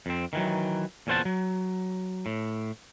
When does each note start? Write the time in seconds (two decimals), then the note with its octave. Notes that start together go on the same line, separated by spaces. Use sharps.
0.06 F2 C4
0.33 D#3 E3 F#3
1.07 E2 A#2 C#4 C5 F#5 A5
1.25 F#3
2.26 A2